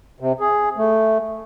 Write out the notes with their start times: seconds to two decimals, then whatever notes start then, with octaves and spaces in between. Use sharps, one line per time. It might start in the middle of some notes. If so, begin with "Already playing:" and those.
0.20 C3
0.40 G#4
0.77 A3